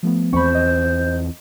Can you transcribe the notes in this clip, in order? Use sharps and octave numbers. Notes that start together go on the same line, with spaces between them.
F3 A3 B3
E2 C4 C5 B5 C#6
D#5